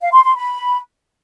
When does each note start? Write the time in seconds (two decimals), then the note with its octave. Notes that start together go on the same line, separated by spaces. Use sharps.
0.01 F5
0.12 C6
0.24 C6
0.35 B5